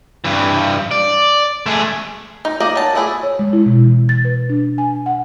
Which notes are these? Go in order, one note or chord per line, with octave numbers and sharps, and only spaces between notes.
G2 E3
D5
A3 G#4
D#4
A#3 A#4 D5 D#5
F#3 A5
A3 E4 G#4 B4 D5
C#5
G#3
E4
B2
E3
A6
B4
D4
G#5
F#5